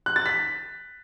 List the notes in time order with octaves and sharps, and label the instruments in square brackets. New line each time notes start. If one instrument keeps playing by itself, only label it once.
[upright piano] F#6
A6
B6